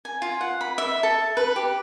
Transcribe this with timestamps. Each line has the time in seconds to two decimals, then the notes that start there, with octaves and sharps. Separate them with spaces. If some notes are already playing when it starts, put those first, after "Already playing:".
0.05 G#5
0.22 F4
0.41 F#5
0.61 B5
0.78 E5
1.03 A4
1.37 B4
1.56 G4